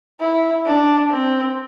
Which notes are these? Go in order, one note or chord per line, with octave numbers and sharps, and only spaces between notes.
E4
D4
C4